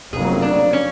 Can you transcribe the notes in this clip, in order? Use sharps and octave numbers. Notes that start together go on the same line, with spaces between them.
F1 F2 C#3 F#3 A#3 G#4
D4
C#4